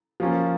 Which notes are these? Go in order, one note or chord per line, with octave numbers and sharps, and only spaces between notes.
F3 A#3 C#4 F4